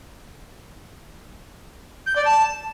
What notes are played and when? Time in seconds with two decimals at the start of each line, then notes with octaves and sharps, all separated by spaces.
2.06 G6
2.16 D5
2.25 A5